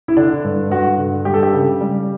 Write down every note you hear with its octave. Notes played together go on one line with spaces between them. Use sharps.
E4
D3 D4
G2
G2 F#4
D3
G3 G4
A4
G4
C#3
G3